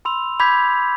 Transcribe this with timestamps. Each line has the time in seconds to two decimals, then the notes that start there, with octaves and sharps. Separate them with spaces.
0.05 B5 C6 E6 F7
0.40 B5 D6 G6 G#6 B6